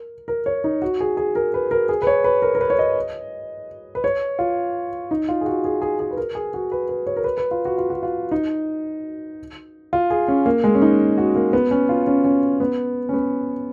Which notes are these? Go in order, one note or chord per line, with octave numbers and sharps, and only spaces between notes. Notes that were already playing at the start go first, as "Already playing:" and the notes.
Already playing: A#4
A#4
C#5
D#4
F#4
G#4
G#4
A#4
B4
A#4
G#4
B4
C#5
B4
A#4
A#4
B4
C#5
D#5
B4
C#5
F4
D#4
F4
G#4
F#4
G#4
G#4
G#4
B4
A#4
G#4
F#4
B4
B4
C#5
A#4
B4
B4
F4
F#4
F4
F#4
F4
D#4
F4
G#4
C#4
A#3
G#3
C#4
D#4
F#4
A#3
B3
C#4
F4
C#4
C#4
B3
C#4
B3